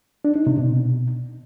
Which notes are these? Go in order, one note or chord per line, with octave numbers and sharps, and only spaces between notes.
D4
D#4
C3
B2